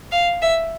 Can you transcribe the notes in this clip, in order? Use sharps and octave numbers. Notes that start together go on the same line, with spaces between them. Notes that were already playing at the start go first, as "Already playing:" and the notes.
F5
E5